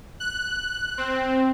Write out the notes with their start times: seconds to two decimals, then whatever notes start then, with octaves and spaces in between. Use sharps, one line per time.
0.20 F#6
0.98 C4